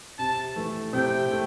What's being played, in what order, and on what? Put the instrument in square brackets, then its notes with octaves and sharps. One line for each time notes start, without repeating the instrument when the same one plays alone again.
[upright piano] C3 [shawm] A5
[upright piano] E3 A3
[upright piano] C3 [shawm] G5
[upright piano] A3